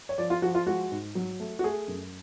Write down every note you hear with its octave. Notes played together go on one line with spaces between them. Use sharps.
C#5
F3 D5
F4
F3 F#4
F4
G#3 F#4
G#2
F#3
A3
F#4
A3 G#4
F#2